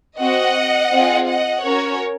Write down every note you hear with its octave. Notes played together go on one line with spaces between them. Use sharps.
C4 F#4 D#5 F#5
C4 F4 G#4
D#5 F#5
C#4 F#4 A#4 C#5